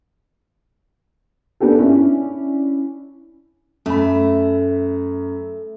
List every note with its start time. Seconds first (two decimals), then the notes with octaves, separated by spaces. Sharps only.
1.60 A#3 B3 D4 G4 A4
1.79 C#4 D4 E4
3.86 F#2 A3 B5